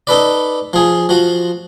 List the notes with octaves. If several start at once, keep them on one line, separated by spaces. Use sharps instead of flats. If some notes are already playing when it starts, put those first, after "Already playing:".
D#4 A4 B4 D5
F3 G#4
F3 F#4